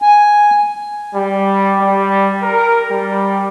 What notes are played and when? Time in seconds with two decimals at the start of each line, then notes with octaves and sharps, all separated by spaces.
0.02 G#5
1.15 G3
1.80 G3
2.43 A#4
2.89 G3